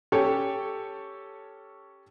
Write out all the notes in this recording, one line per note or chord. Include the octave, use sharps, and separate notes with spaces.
C#4 G4 A4 C#5